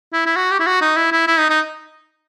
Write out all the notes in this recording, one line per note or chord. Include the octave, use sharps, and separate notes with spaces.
E4
E4
F#4
G4
E4
F#4
D#4
E4
E4
E4
D#4
D#4